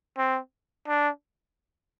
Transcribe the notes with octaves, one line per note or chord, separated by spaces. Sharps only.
C4
D4